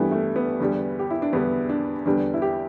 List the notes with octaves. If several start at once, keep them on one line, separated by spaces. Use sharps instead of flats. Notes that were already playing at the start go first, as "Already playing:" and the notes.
Already playing: G2 E3 G3 A3 B3
A3
B3
E2 D3 G3
G4
E4
D4
E2 D3 G3 B3
D4
E2 D3 G3 D4
E4
G4